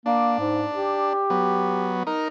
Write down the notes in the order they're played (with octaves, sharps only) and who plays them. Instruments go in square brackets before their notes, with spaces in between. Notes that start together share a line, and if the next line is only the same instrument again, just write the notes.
[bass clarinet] A#3 [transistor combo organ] D4
[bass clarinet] G#2
G4
[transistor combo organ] F#3 B3
D#4 A#4